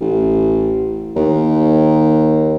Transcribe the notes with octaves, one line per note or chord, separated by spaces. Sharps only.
A1
D#2